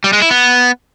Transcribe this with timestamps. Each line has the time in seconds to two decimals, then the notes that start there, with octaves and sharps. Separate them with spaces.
0.04 G3
0.13 G#3
0.22 E4
0.31 B3